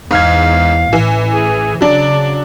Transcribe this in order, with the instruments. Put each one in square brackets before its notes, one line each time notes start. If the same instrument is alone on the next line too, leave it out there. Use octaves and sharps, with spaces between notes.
[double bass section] E2 [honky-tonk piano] G#2 F6 G#6 [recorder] F5
[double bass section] A1 [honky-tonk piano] E3
[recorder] G#4
[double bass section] C#3 [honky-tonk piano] F#3 D4 [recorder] D5